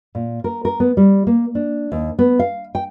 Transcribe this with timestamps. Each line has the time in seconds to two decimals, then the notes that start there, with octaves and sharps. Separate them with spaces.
0.15 A#2
0.44 A#4
0.65 A#4
0.80 B3
0.97 G3
1.27 A#3
1.55 D4
1.92 D#2
2.19 B3
2.39 F5
2.75 G5